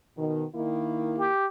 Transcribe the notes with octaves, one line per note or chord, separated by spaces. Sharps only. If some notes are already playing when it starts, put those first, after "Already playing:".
B2 D#3
D#3 A#3 E4
G4